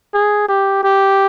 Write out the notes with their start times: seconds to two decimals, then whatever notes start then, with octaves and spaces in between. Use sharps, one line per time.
0.14 G#4
0.48 G4
0.83 G4